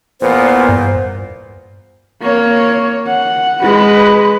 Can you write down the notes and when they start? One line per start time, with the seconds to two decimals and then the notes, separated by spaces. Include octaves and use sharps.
0.21 E2 A#2 B3 C5
0.69 G2
2.21 A#3 C#5
3.07 F#5
3.62 G#3 B4